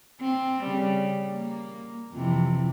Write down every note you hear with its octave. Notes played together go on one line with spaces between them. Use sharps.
C4
C#3 G3
A#3
F2 C3 E3